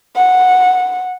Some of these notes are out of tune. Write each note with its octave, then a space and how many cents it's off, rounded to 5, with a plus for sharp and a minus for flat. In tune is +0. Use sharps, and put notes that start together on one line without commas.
F#5 -10